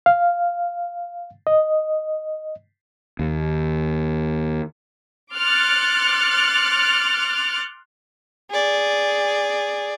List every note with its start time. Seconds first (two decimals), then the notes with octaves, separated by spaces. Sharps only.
0.06 F5
1.47 D#5
3.19 D#2
5.33 C6 D6 F6 F#6 A6 C#7
8.51 G#4 D5